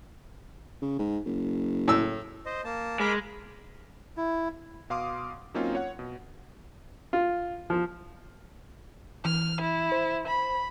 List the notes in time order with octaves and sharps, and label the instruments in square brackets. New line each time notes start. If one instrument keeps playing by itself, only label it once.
[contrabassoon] C#3
G#2
F#1
[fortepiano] A2 E6
[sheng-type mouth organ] C5 D#5
A#3 A5
[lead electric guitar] G#3 [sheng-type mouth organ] A#4 B5 D6
[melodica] E4
[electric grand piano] B2 F5 C6 D6 D#6
F#3 A#3 C4 C#4 D#4 F4
C#5 F#5
B2
[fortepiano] F4
F3
[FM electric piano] E3 [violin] F6
[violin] E4
[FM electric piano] C5
[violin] B5